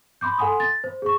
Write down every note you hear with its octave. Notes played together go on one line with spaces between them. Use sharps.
B5 C6 D6 G6
A4 F#5 G#5 C6 D#6
A6
C5
G#4 C#6